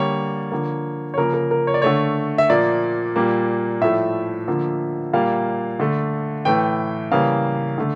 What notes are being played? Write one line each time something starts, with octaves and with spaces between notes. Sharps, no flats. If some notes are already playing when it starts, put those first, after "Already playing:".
Already playing: D3 G3 A#3 C#5
D3 F3 A#3
C#5
C#3 F3 A#3 A#4
A#4
A#4
C#5
D5
D3 A3 C#5
E5
A#2 F3 A#3 D5
A#2 G3 A#3
A2 F3 A3 E5
D3 F3 A#3
A#2 G3 A#3 F5
D3 A3
A2 E3 A3 G5
C#3 E3 G3 A#3 F5
D3 A3